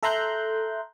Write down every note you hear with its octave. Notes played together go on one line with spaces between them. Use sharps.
A4 E5 A#5 C6 F#6 G6